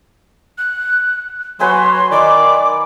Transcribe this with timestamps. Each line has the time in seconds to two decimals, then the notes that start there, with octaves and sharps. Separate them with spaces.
0.58 F#6
1.60 F#3 B4 G#5 B5 C6
2.12 D#3 D5 D6